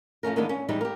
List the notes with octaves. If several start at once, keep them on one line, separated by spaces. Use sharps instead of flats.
F3 A3 C#4 A#4
D#3 E3 G#3 A#3 B3 D4
C#4
E3 G3 G#3 D#4
G4 A#4